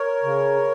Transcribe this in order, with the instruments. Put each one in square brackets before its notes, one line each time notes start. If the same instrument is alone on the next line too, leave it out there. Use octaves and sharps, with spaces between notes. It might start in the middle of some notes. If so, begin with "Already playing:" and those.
Already playing: [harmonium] A#4 C#5
C#3